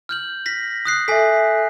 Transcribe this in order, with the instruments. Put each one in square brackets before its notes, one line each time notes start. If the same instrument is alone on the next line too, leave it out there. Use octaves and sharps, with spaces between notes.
[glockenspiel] F6 G6 F#7
A#6 B6
D#6 F#6 C7
[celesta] A4 E5 [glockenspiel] G#5 B6